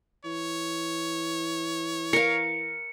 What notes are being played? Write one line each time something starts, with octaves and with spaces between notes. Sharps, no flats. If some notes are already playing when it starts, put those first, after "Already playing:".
E3 C#5
A#4 F5 C#7